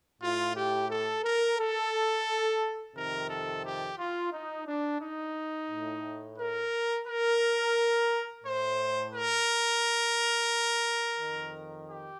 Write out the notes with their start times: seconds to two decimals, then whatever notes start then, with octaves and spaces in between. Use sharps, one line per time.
0.21 A2 F4
0.55 G4
0.89 A4
1.24 A#4
1.58 A4
2.95 F2 C3 D#3 A#4
3.29 A4
3.64 G4
3.98 F4
4.33 D#4
4.67 D4
5.00 D#4
5.70 A2
6.39 A#4
7.07 A#4
8.44 A2 C5
9.13 A#4
11.19 F2 D#3
11.88 G4